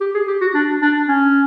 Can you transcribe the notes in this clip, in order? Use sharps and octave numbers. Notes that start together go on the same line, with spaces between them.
G4
G#4
G4
F#4
D4
D4
C#4